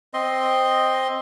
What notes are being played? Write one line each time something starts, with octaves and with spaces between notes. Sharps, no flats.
C4 D#5 C6